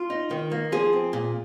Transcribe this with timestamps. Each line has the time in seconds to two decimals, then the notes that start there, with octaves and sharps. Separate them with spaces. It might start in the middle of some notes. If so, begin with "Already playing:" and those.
Already playing: F4
0.10 D#4
0.31 D#3
0.51 A#3
0.72 F3 G#4
0.93 C4
1.13 A#2